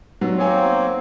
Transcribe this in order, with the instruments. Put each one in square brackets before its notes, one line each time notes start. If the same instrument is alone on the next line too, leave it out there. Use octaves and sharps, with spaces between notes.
[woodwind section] G2 [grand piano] F#3 [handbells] B3 D#4
[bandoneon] F#3 A#3 C4 [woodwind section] C5 [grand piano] C#5 G#5